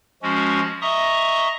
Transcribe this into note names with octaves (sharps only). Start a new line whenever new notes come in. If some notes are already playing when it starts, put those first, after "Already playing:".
F3 G#3 C#4 F#4
D#5 E5 A#5 C#6 D#6